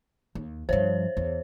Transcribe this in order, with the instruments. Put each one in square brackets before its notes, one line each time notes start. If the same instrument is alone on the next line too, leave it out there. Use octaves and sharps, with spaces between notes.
[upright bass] D#2
[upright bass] G2 F3 [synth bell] C5 C#5
[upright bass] E2